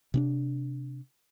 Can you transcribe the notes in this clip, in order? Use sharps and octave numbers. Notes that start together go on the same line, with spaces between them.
C3 C#4 D4